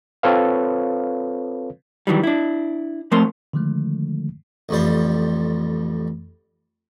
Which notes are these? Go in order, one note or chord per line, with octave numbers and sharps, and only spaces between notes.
C4 F4 A4 B4 C#5 F5
D#3 E3 F#3 G3
D4 E4
F3 A3 C4 A#4 C6
D3 D#3 F3 G#3 A3
A1 F2 A2 G3 C5